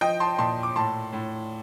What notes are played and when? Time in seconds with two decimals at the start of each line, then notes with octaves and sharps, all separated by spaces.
0.01 F3 D#5 G5
0.20 A5 C6
0.38 A#2 A5 C6
0.63 D6
0.76 A2 A5 C6
1.13 A2